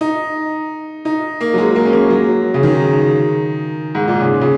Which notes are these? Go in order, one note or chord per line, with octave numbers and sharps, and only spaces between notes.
D#4
D#4
A#3
F#3
G#3
A#3
C#4
A#3
F#3
C#3
D#3
G#2
A#2
C#3
C#3